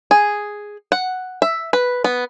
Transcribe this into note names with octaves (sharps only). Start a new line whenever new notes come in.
G#4
F#5
E5
B4
B3